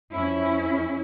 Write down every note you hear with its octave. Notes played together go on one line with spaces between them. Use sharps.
F2 C#4 E4